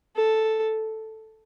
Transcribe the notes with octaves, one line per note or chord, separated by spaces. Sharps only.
A4